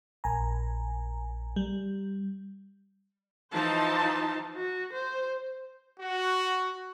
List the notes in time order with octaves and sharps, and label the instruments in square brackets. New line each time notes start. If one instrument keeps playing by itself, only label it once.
[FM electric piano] A#1 G#5 A#5
G3
[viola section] E3 F3 D#4 C5 A5
[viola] F#4
C5
[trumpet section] F#4